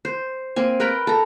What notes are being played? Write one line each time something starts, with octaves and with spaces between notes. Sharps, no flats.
C5
A#3 C4 G#5
A#4 B4 G5 A#5
A4 A#5